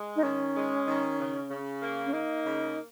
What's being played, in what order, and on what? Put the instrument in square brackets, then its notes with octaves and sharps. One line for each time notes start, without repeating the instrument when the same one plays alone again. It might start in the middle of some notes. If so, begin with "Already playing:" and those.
Already playing: [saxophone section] G#3
[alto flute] D#4
[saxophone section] D#3 [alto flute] C#4
[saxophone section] G#3
D#3
C#3
C#3
A#3
[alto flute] C#4
[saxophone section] A#3 [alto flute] D#4
[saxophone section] C#3